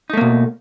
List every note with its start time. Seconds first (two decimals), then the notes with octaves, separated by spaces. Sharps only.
0.10 D#4
0.13 A3
0.17 A#3
0.21 B2